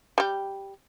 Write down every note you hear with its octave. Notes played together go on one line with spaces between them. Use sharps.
G3 G4